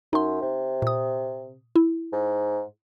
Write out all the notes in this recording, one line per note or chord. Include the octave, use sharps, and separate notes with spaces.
F#2 D#4 C6
C3
A#2 D#6
E4
G#2